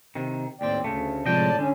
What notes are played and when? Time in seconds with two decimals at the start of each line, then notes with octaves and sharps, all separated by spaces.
0.15 C3 D#3
0.61 D#2 A2 C4 D5 G5
0.84 D2 C#3 A3
1.26 A2 C3 F3 G#3 D5 D#5 G5 A5
1.59 D3 C#4